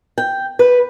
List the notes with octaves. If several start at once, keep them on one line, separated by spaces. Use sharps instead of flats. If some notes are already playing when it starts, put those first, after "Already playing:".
G5
B4